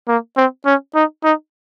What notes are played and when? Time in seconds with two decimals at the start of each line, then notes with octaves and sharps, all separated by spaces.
0.08 A#3
0.37 C4
0.66 C#4
0.95 D#4
1.24 D#4